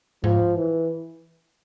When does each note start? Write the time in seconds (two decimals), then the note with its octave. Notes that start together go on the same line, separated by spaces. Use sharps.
0.24 G#2 F3
0.56 E3